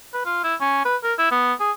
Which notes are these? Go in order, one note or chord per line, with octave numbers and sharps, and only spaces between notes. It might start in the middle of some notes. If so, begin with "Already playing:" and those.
B4
F4
E4
C#4
B4
A#4
E4
B3
G#4